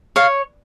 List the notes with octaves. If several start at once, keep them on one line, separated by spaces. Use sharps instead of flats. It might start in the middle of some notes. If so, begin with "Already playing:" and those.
C#5 F5